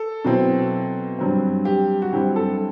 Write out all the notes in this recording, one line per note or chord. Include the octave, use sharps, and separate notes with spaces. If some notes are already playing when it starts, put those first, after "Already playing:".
Already playing: A4
B2 F#3 C4 E4
G2 F#3 C4
G4
F#4
G2 F#3 C4 E4 G4
A4